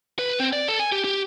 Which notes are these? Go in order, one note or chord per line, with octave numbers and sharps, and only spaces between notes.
B4
C4
D5
A4
G#5
G4
G4